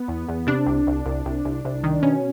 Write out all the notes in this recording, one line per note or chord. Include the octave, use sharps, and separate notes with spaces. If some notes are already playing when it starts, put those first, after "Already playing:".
Already playing: B3
E2
E2
C3 D4
C2
C2
C2
C2
C2
C2
D#3
B2 C#4